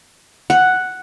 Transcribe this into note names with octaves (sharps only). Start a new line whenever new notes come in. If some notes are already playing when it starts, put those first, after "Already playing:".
F#5